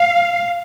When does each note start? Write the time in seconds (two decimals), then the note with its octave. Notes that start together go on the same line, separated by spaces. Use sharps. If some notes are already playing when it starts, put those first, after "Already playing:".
Already playing: F5